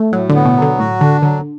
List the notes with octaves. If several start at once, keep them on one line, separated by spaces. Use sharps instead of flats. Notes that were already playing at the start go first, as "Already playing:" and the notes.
Already playing: A3
A2 F#3
D3
B3
B2
D3 F#3
A2 F#4
D3 D4
D3 F#3